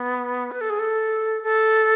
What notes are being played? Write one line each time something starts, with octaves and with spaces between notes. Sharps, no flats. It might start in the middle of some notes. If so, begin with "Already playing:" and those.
Already playing: B3
B4
A4
G#4
A4
A4